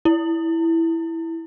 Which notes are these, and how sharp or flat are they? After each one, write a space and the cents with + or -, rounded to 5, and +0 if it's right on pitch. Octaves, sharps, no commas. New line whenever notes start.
E4 +0